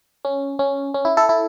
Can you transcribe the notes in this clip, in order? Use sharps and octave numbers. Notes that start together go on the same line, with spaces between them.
C#4
C#4
C#4
E4
E4 A4
E4 A4